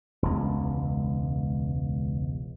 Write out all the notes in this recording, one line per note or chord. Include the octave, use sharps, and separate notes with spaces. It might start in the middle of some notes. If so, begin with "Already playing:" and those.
E1 C#2